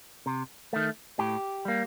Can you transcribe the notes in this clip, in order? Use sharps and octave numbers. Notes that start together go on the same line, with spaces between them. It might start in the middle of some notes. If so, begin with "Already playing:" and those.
C3
D#3 A3
A2 G4
G3 A#3